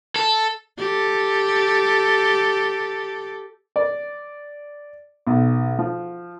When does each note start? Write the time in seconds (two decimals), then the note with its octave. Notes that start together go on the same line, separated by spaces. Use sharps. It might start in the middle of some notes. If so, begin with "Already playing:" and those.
0.16 A4
0.78 G4 A4
3.76 D5
5.27 B1
5.79 F3